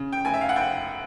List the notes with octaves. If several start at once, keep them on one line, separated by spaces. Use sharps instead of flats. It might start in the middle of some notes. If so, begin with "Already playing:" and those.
Already playing: C#3
G5
F1 G#5
E5
F5
F#5
F1 G5